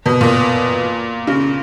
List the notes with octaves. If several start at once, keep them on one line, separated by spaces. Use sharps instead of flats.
B2
A#2
C#3